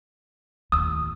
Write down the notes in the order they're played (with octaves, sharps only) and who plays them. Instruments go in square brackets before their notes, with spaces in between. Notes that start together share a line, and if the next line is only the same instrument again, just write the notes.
[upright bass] D#2 A2 [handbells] D#6 E6